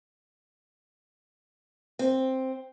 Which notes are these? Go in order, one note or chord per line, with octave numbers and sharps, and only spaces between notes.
C4